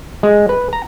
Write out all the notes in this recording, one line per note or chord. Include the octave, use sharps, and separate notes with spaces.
G#3
B4
A#5